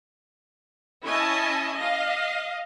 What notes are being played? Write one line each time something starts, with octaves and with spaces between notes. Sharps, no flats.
C#4 E4 D#5 E5 G#5 A5
D#5 F5